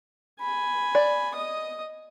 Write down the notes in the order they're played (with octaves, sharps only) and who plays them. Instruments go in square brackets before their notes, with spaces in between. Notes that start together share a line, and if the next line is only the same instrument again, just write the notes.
[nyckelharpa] G#5 B5
[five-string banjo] D5
[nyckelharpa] D#5 D#6